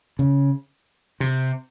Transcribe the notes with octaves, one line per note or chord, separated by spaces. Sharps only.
C#3
C3